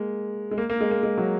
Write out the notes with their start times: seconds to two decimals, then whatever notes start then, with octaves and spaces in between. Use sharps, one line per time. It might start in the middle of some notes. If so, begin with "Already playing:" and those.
Already playing: G#3 A#3
0.51 G#3
0.58 A#3
0.70 A#3
0.81 G#3
0.91 A#3
1.03 G#3
1.18 F#3